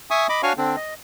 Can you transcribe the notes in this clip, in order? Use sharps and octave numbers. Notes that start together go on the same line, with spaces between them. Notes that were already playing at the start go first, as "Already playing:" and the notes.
E5 G#5 C#6 D#6
D#5 B5 D6
D4 F#4 C#5 F5 G#5 C#6
D3 C4 D4
D#5